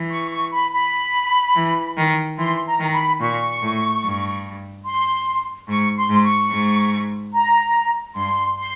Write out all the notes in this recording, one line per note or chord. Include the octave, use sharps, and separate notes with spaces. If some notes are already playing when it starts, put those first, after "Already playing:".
Already playing: E3
C#6
C#6
B5
B5
E3
D#3
E3 C6
A#5
D#3
B5
A#2 C#6
A2
G2
C6
G#2 C#6
C6
G#2
C#6
G#2
A#5
G2 C6
C6